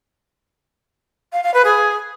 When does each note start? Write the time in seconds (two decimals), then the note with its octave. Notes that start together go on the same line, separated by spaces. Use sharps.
1.33 F5
1.43 F5
1.54 B4
1.65 G#4